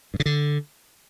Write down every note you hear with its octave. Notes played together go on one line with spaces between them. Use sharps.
G2
C#3
D3